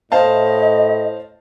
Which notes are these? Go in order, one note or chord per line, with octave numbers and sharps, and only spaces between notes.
A2 C5 D#5 F5 A5